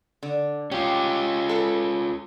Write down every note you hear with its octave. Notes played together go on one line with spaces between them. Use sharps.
D3
C#4 F4 G4
A4 B4